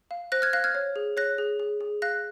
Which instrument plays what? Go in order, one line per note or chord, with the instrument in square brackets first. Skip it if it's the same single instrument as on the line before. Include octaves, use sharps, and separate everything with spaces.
[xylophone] F5
C5 F#6 A#6
F6 G#6
F5 F#6 A#6
F6 G#6
C#5
G#4
C#5 F#6 A#6
G#4
G#4
G#4
F5 F#6 A#6